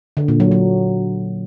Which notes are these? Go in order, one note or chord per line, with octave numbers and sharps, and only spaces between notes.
D3
A#2
F#3
F#3